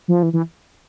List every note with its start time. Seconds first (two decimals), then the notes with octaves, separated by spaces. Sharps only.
0.08 F3
0.23 E3
0.33 E3